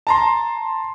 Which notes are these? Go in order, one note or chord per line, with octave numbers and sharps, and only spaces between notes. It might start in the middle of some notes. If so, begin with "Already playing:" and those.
A5 A#5 C6